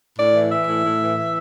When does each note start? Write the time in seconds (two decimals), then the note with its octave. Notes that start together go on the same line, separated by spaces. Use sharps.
0.18 A2 D5
0.35 E3
0.52 E3 E5
0.68 A2
0.84 A2
1.01 E3
1.17 E3